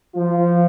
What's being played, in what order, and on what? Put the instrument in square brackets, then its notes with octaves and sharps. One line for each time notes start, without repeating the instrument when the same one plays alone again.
[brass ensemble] F3 F4